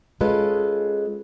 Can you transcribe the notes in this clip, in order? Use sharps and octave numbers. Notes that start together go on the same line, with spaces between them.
G#3 C#4 F4 A4 B4